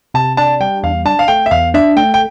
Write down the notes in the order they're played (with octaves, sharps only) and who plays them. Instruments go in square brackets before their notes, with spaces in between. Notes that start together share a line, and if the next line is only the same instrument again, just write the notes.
[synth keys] C3 [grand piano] A5
[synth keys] D4 [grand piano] A5
[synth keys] G3 [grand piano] G5
[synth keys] E2 [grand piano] F5
[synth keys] D4 [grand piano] A5
[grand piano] F5
[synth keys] A3 [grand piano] G5
[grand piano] E5
[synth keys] E2 [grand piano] F5
[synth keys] D4 [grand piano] E5
[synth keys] A3 [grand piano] G5
[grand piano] G5